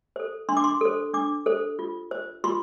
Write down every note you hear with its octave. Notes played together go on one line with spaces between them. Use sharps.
A4 C5
D4 C6
D6
C6
A4 C5
D4 D6
A4 C5
F4
C5
F4 C6